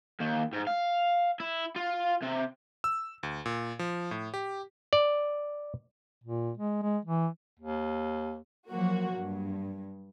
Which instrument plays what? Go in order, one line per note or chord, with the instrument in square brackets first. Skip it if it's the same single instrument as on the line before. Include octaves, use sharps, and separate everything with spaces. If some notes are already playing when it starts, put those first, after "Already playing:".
[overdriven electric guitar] D#2
G#2
F5
E4
F4
C3
[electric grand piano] E6
D2
A#2
F3
A2
G4
[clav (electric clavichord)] D5
[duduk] A#2
G#3
G#3
E3
[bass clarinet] D#2
[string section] F3 F#3 A#3 F#4
G2